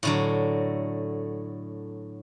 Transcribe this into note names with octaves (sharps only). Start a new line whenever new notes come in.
A2 D3 F#3